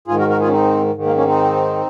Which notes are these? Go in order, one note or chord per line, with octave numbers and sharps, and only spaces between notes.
G#2 D#3 F4 G#4
F#4 A#4
F#4 A#4
F4 G#4
C#4
C4 D#4
G#2 D#3
A#3
A#3 C#4
C4 D#4